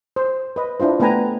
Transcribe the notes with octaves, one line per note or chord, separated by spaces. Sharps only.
C5
B4 D#5
D4 E4 F4 C5
A3 B3 B4 G5 G#5 A#5